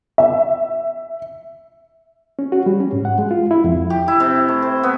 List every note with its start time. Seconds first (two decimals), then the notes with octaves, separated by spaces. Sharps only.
0.18 E5
2.39 C#4
2.52 F#4
2.66 G3
2.80 C#4
2.93 G#2
3.05 F#5
3.19 G#3
3.31 F4
3.51 E4
3.64 F2
3.90 G4
4.08 E4
4.20 C3
4.49 A3
4.62 C5
4.83 B3